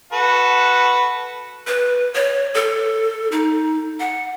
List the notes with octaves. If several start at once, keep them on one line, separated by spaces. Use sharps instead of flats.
F#4 A4 B4
B4
C#5
A4
D#4
F#5